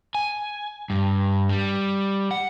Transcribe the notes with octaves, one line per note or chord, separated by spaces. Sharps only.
G#5
G2
G3
F#5